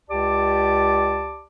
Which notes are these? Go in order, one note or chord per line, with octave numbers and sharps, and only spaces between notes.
C#2 G4 D5 A5 D6